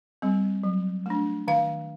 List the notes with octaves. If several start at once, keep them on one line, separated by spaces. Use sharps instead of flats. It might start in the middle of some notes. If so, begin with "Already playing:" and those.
G3 C4
F#3
A3 D4
D#3 F5